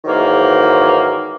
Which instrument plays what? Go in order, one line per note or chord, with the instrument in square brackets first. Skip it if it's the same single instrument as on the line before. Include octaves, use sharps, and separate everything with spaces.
[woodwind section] G#2 D#3 E3 F#3 A#3